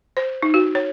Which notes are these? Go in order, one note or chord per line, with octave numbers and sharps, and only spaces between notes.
C5
D#4
F#4
C#5